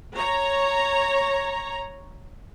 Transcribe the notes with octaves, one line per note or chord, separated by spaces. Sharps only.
C#5 A#5